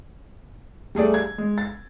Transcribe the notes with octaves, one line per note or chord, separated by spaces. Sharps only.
G3 A3 G#4 D5
G#6
G#3
A6